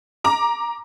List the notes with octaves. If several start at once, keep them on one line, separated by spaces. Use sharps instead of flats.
A#5 D6